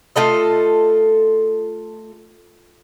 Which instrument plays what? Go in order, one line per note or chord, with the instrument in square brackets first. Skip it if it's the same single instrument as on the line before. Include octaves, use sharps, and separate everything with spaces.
[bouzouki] A3 F4 A4 D#5